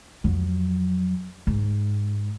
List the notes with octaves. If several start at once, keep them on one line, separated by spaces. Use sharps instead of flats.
F2 F#3
G#2